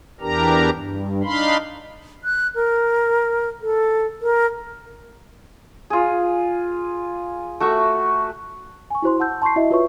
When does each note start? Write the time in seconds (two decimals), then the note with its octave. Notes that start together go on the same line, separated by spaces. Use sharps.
0.20 E2 E3 D4 G4 A#4 A#5
0.74 G2
1.24 D4 D#4 F5 B5 C6
2.24 F#6
2.55 A#4
3.62 A4
4.21 A#4
5.90 F4 G#4
7.60 A3 F#4 E5 C#6
8.90 G#5 C#6
9.02 E4 F#4 C5 C6
9.20 F#5 A5 E6 G6
9.42 A5 C6 C#6 G6 C7
9.56 E4 F#4 D#5 E5
9.70 F4 F#4 B4 C#5 E5 C#6